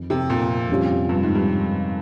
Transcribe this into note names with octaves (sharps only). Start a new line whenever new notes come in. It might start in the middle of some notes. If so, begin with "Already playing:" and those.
Already playing: F2 D#3
C3
A#2
F2 C3 G3 C#4 F4
G2
G#2
G2